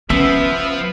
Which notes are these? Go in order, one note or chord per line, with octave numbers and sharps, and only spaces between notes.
F3 B3 C#4 E5